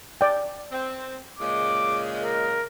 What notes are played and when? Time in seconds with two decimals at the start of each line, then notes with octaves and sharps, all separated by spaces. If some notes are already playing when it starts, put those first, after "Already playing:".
0.21 D5 G5
0.71 C4
1.39 A#2 C#3 G#3 D6
2.23 A#4